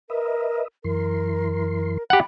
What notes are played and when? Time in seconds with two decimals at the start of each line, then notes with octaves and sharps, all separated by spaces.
0.10 A#4 B4 D#5 E5
0.84 F#2 E3 A#4 C6
2.10 G4 F#5 A5 B5